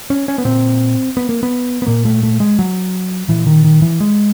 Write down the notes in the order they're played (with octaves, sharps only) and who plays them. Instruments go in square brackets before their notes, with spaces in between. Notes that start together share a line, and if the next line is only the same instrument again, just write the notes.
[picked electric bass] C#4
C#4
B3
A#2 C4
B3
A#3
B3
B3
A#2 A#3
A3
A3
G#3
F#3
A#2 E3
D#3
D#3
E3
G#3